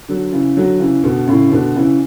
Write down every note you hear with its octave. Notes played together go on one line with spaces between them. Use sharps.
D3 F#3
C#3 E3
D3 F#3
C#3 E3
B2 D3
A2 C#3
B2 D3
C#3 E3